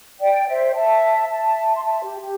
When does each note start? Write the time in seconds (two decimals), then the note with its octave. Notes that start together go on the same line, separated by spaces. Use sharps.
0.20 D5 G5
0.48 C5 E5
0.75 E5 A5
1.29 E5 A5
1.76 C6
1.84 E5 A5
2.03 G4
2.20 G4